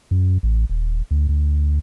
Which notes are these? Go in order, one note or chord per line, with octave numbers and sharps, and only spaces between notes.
F#2
A1
D#1
D2
D2